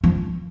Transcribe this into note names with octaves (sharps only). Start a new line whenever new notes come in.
F3